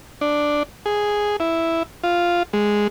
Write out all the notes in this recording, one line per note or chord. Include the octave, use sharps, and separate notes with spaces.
D4
G#4
E4
F4
G#3